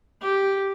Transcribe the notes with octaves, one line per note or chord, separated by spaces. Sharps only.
G4